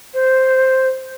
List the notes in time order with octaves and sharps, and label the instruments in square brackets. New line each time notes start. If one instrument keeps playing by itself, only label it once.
[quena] C5